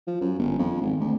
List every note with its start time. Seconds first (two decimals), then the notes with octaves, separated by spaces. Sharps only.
0.07 F3
0.21 F#2
0.39 G1
0.59 F2
0.81 G#1
1.01 D2